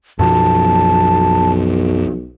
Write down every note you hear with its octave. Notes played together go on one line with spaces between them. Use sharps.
B1 F#2 B2 F3 A5